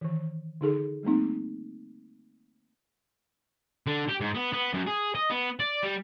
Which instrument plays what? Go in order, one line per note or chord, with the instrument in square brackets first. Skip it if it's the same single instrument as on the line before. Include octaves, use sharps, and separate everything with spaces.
[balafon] D#3 E3
D3 D#4 G#4 A4
G3 A3 A#3 C4 D#4
[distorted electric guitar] D3
G4
G#2
B3
B3
F#2
G#4
D#5
B3
D5
G3